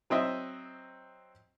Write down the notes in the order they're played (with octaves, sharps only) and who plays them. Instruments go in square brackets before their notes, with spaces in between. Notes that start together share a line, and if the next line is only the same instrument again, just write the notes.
[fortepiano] F#3 C4 D#5 E5